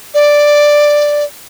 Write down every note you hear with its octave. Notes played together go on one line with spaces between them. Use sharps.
D5